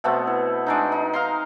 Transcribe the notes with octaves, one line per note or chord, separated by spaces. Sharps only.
B2 A3 B3 C4
E4
G#3 D4 D#4
D#4
F5 A#5 C6